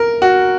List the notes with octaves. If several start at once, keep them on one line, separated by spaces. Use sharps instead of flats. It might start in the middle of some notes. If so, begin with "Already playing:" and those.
Already playing: A#4
F#4